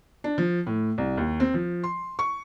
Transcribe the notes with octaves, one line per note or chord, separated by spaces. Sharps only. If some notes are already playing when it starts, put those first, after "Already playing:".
D4
F3
A2
C2
D#2
C4
F3
C6
C#6